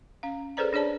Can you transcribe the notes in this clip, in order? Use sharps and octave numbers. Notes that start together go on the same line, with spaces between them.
C#4 F5
G#4 A4 B4 C5 D5 A#5
D4 G#4 C#5 D5 A5